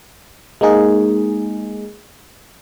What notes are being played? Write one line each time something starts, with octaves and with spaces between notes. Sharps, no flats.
G#3 A#3 D#4 G#4